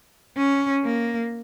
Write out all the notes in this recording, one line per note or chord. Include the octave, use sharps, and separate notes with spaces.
C#4
A#3